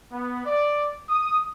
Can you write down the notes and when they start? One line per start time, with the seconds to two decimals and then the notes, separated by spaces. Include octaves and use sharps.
0.12 B3
0.46 D5
1.09 D#6